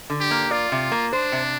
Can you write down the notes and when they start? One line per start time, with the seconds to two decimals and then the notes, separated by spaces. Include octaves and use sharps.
0.10 D3
0.21 G4
0.31 A#3
0.51 F4 D5
0.72 C3
0.92 A#3
1.12 D4 C5
1.32 C3